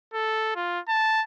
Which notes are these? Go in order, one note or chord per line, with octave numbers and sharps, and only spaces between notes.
A4
F4
A5